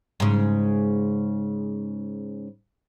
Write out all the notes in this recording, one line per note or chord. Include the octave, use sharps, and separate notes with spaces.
G#2 C#3